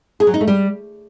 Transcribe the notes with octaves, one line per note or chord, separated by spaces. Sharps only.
G#4
F#3
D#4
A3
G3